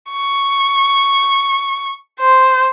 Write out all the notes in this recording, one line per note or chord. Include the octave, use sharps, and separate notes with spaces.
C#6
C5